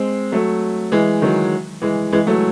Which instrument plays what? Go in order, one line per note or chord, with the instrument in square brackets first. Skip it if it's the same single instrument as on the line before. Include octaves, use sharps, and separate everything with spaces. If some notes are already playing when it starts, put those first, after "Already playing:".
Already playing: [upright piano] G#3 C4
F#3 A3
E3 G#3
D#3 F#3
E3 G#3
E3 G#3
F#3 A3